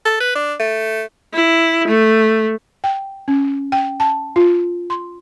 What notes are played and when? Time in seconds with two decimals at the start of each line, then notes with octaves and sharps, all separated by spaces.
0.05 A4
0.21 B4
0.35 D4
0.60 A3
1.33 E4
1.88 A3
2.84 G5
3.28 C#4
3.72 G5
4.00 A5
4.36 F4
4.90 C6